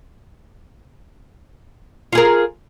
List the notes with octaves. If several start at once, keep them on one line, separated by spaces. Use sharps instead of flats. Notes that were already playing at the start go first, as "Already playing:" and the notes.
F4 G#4 A#4